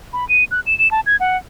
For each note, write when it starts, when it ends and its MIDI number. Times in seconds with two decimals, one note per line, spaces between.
0.13 0.27 83
0.29 0.44 99
0.51 0.60 90
0.66 0.77 100
0.79 0.90 100
0.91 1.00 81
1.06 1.16 92
1.20 1.37 78